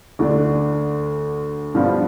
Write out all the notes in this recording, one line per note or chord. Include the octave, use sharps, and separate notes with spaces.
D2 D3 A3 D4
G2 F3 B3 D4